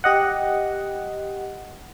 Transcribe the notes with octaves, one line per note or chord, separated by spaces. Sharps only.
G4 D#5 F#5